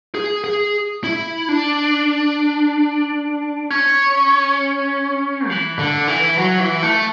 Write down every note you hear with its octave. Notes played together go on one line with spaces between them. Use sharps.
G#4
G#4
E4
D4
C#4
E3
D3
E3
F#3
E3
A3